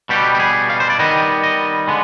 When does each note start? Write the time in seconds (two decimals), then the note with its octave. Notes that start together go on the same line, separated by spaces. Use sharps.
0.09 B2 G3 B3 G4
0.35 G4
0.40 G#4
0.70 F5
0.80 C5
0.90 D5
0.99 D#3 G3 B3 D#5
1.43 D#5
1.88 D3 G#3 B3